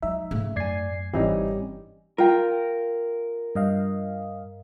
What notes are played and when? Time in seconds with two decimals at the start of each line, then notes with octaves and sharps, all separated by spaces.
0.02 F#3 G#3 D#4 E5
0.31 G#2 C#3 A3
0.56 F#2 D5 G#5 G#6 C7
1.14 G1 G#2 E3 G3 C4 C#4 D#4 G4
2.18 F4 A#4 G5
3.55 G2 D#5 F5